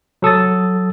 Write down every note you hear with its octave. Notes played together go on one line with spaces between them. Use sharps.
F#3 A4 D#6 A6